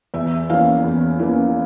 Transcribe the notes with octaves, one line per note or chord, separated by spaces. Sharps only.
E2 E5
E3 A#3 C#4 F5
E2
E3 A#3 C#4